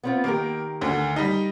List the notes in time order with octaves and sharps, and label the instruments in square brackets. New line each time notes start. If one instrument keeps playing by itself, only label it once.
[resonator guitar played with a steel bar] B3 C4 F4
[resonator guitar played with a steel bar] D#3 G4 A#4 [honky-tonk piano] A#3
[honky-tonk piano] D2 D3
G3 D#4